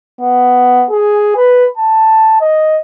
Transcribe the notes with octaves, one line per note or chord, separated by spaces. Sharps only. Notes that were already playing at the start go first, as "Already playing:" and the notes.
B3
G#4
B4
A5
D#5